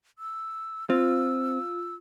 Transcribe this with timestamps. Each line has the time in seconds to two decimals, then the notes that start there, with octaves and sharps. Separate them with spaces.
0.19 E6
0.90 C4 F4 E6